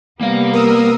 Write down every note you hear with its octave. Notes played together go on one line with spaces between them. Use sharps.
C3 G3 A#3 B3 F5
A#4 D#6 E6